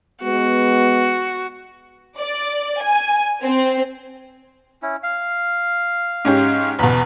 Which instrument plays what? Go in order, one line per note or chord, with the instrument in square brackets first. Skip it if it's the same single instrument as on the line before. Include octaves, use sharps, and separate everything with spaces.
[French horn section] G#3 B3 [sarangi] F#4
[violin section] D5
G#5
C4
[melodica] C#4 E4
F5
[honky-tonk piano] G#2 C#4 G4
[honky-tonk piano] E2 B2 [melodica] B5